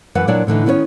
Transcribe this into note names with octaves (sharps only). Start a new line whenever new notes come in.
F#2 E3 B4 F#5
A#2 F#3 D4 C#5 D5 F#5
A2 D3 E3 D#4
D#3 B3 C#4 A4 C#5